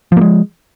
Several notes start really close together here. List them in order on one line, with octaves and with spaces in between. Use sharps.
F3 A#3 G#3